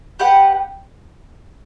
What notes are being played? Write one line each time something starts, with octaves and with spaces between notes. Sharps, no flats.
G4 B4 F#5